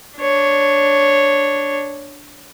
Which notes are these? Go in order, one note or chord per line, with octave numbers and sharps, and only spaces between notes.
D4 C#5